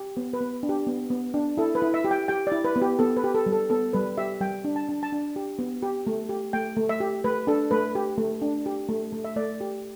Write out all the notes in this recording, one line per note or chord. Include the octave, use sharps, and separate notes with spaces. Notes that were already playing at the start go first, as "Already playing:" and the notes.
Already playing: G4
B3
B4
B3
D4
G4
B3
B3
D4
E4 A4
B4
E4
E5
G4
G5
G4 G5
E4 D5
B4
B3
G4
B3 A4
B4
G4
A4
G3
A4
B3 A4
G3 B4
G4 E5
G3 G5
D4
A5
D4
A5
D4
G4
B3
G4
A3
G4
A3 G5
A3
E5
G4
A3 B4
D4 A4
A3 B4
G4
A3
D4
G4
A3
A3
E5
A3 D5
G4